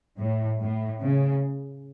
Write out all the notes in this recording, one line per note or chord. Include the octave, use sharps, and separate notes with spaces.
A2
A2
C#3